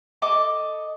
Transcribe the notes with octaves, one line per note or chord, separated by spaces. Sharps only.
A4 D#5 D6